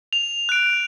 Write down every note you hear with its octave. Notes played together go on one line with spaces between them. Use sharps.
F7
F#6 D7